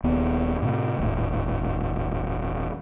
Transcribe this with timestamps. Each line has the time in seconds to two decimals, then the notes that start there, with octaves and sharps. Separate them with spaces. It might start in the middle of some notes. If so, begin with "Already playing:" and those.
0.04 D#1 D#2 B3
0.62 A2 C3 A3
0.99 D#1 G#1 A2